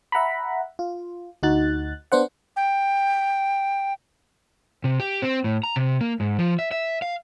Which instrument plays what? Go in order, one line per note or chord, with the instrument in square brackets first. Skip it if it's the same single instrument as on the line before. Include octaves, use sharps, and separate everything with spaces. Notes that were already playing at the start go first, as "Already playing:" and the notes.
[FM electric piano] E5 F#5 A#5 B5
F4
D2 D#4 F#4 F#6 A6
B3 D4 C5 F#5
[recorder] G5
[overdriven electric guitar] C3
G4
C4
A2
A#5
C3
A#3
G#2
F3
E5
E5
F5